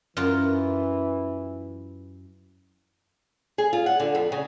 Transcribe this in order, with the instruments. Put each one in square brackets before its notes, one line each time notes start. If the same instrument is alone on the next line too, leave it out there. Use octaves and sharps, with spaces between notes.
[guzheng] F#2 F4 A#5 [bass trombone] E3
[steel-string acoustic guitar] G#4
F4
F#5
D3
F2
C#3